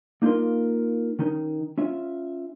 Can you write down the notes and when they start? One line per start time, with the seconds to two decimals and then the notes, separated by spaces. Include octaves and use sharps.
0.22 A#3 D#4 F4 A#4 C6
1.19 D#3 C#4 D#4
1.78 C#4 F4 E5